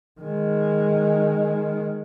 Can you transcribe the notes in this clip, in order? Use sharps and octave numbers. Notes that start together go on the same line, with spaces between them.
D#3 G#3